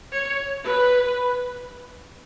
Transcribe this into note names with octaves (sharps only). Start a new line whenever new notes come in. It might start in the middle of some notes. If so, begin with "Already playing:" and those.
C#5
B4